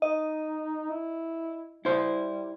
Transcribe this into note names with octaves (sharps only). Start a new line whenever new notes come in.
D#4 D#5
E4
G3 E4 C5